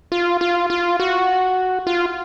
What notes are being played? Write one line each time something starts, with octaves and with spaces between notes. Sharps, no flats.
F4
F4
F4
F#4
F4